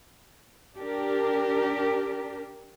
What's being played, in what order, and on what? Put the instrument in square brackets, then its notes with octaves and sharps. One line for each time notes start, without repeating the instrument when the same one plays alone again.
[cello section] D4 G4 A#4